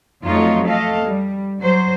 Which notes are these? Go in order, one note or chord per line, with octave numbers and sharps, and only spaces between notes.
F2 F#3 A3 D#4 F4 C#5
A3 A4 D#5 F5
G3
F#3 C5